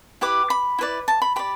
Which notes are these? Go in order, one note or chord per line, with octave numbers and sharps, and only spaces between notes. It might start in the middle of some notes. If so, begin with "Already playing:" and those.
E4 G4 B4 D6
B5
E4 B4 D5
A5
B5
G4 D5 B5